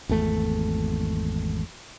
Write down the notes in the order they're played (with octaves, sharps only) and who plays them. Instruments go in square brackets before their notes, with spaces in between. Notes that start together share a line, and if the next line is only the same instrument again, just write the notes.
[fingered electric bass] G#1 E2 A3